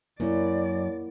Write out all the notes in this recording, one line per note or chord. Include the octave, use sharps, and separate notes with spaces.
F#2 A#3 E4 D5